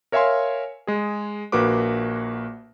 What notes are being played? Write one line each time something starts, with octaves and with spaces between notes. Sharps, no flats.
A#4 C#5 E5 F5 G#5 C6
G#3 G#4
A#1 A#3 F#4 B4 D6